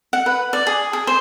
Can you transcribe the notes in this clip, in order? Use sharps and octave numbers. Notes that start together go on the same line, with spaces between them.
F#5
B4
D5
G#4
G#4
C5